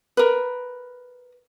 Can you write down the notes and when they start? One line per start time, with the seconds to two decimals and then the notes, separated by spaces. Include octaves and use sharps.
0.17 A#4 B4